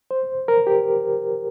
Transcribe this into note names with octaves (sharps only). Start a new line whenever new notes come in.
C5
A#4
G4